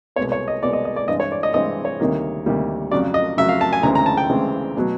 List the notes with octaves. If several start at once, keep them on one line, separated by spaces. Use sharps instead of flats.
C2 B2 G#3 B3 C#5
C#5
D#5
C2 B2 G#3 B3 D5
D#5
D#5
D5
G2 E3 G#3 C4 D#5
C#5
D5
D#5
G2 E3 G#3 C4 D#5
C#5
D2 C3 D#3 G3 A#3
D2 C3 D#3 G3 A#3
F2 C#3 F#3 D5
D#5
F2 C#3 F#3 E5
F5
A5
G#5
D2 C#3 E3 G#3 C4 A#5
A#5
A5
G5
D2 C#3 E3 G#3 C4
B2 F#3